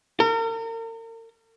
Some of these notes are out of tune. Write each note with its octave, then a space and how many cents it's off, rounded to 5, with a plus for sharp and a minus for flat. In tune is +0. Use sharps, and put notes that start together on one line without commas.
A#4 -40